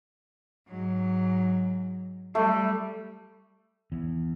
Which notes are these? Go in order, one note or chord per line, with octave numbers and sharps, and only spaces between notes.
G#2 F#3
G3 A3
E2